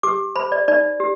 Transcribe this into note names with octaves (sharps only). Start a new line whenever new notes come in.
G4 D6
C5 B5
D5
D#4 D5
G4